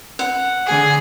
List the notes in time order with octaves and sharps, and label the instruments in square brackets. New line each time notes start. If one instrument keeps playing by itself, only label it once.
[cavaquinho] F#5
[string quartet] D3 G#4